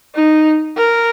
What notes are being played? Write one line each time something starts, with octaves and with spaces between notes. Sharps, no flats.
D#4
A#4